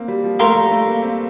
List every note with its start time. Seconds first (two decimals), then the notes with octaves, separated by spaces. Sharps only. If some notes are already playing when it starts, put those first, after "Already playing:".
Already playing: A#3 C4
0.08 G3
0.24 F3
0.39 A3 A#4 F5 C6
0.55 G3
0.71 A3
0.87 A#3
1.03 C4